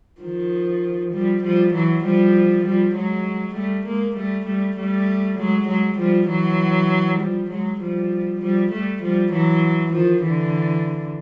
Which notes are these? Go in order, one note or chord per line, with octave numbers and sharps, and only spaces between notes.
D#3 F3
F3 G3
F3 G3
E3 F#3
F3 G3
F3 G3
F#3 G#3
G3 A3
G#3 A#3
G3 A3
G3 A3
G3 A3
F#3 G#3
F#3 G#3
F3 G3
E3 F#3
F3 G3
F#3 G#3
F3 G3
F3 G3
G3 A3
F3 G3
E3 F#3
D#3 F3
D3 E3